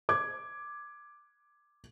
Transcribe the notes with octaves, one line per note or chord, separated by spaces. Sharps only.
D6 G#6